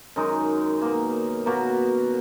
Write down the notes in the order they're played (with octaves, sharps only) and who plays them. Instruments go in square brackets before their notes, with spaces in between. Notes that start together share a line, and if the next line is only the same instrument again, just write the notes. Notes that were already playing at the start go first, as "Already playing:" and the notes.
[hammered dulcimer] F#2 D#3 G#3 D#4
B2 A#3
B2 A#3 F#4 A#4